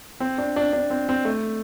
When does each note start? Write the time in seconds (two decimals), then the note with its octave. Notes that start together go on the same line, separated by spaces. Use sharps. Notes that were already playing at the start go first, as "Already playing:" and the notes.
0.20 C4
0.38 D4
0.56 D4
0.73 D4
0.90 C4
1.09 C4
1.25 A3